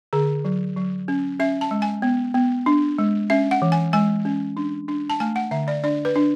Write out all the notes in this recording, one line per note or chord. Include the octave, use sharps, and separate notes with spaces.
D3 G#4
F#3
F#3
C#4
C#4 E5
A5
G#3
G#5
B3
B3
D4
G#3
C#4 E5
F#5
E3
G#5
G#3 G#5
C#4
D4
D4
A5
A3 G#5
F#5
D3 E5
D5
D4 D5
B4
D4